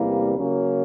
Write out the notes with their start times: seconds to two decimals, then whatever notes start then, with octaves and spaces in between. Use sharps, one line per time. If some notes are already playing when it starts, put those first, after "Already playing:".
Already playing: E2 C3 E3 G3 A#3
0.37 C#3 F#3 A#3 C#4